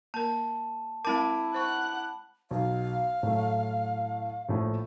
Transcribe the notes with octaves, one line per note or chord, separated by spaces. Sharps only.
A#3 A#4 A5
G#3 C4 E4 A#4 A5 B5 D6
C5 F#5 C#6 F#6
B1 F5
A2 F#3 A3
A#1 A2 A3